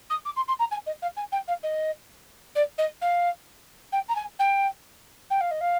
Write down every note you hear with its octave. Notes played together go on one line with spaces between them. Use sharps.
D#6
D6
C6
C6
A#5
G#5
D#5
F5
G#5
G5
F5
D#5
D5
D#5
F5
G5
A#5
G#5
G5
G5
F5
D#5
F5